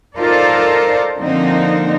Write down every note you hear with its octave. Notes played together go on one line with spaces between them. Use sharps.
D#4 F4 A4 A#4 C5 D5
D3 F3 A#3 C4 D#4